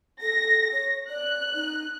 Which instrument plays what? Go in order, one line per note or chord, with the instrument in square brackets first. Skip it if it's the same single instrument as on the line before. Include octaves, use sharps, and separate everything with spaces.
[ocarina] A4 [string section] A#6
[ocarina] C#5
[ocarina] D5 [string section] F#6
[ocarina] D#4